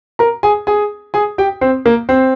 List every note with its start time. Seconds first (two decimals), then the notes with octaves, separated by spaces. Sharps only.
0.19 A#4 A#5
0.43 G#4 G#5
0.67 G#4 G#5
1.14 G#4 G#5
1.38 G4 G5
1.61 C4 C5
1.85 A#3 A#4
2.09 C4 C5